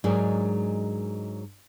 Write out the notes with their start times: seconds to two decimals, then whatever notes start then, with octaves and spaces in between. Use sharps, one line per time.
0.04 G#2 F#3 G#3 D4 G#4 A#4